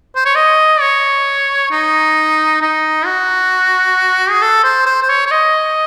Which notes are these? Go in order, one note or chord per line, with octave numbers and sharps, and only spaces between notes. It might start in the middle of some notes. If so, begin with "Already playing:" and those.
C5
C#5
D#5
C#5
D#4
D#4
F#4
G#4
A4
C5
C5
C5
C#5
C#5
D#5